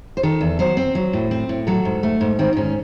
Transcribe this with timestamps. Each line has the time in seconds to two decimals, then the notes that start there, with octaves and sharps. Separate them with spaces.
0.17 C5
0.23 D#3 A4
0.41 E2
0.59 F#3 C5
0.77 C4
0.95 F#3
1.13 A2
1.31 C4
1.49 A2
1.67 F#3 A4
1.85 G#2
2.03 A3
2.21 G#2
2.39 D#3 C4
2.53 D#4
2.56 G#2 C#4